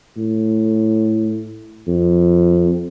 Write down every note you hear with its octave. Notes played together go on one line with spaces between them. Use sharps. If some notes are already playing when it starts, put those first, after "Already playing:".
A2
F2